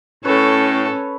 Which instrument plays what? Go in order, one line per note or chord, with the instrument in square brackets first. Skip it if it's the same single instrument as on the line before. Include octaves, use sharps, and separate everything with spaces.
[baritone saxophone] A2 [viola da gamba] C#4 [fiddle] A4 [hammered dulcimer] B4 C#5